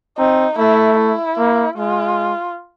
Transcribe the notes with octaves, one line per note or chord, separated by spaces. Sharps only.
C4 D#4
A3 E4
E4
A#3
G#3 F4